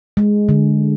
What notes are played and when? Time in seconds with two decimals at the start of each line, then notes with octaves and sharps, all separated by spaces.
0.17 G#3
0.49 D3